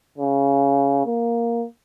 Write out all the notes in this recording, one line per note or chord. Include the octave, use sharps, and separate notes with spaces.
C#3
A#3